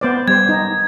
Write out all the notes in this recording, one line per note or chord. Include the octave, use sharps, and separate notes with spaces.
B3 C5 D5
G3 C5 G#6
D#4